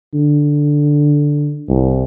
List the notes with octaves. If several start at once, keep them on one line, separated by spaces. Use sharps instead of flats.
D3
C2